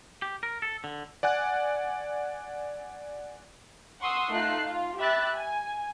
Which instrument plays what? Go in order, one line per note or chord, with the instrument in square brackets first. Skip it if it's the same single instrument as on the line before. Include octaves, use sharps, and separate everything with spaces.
[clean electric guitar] G4
A#4
A4
D3
[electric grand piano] D5 F#5 G#5 F#6
[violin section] F#5 C6 C#6 D#6 E6
A3 D#4 F4 A5 F#6 C7
F4
G4 E5 B5 F#6 A6
G#5